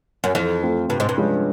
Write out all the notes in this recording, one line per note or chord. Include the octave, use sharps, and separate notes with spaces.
F#2
F2 E3
A3 C4 F4
G2 C3
G#2
G2
F3 G#3 C#4 F4